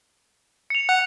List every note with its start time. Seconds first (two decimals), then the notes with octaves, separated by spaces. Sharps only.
0.70 C#7 F7
0.89 F#5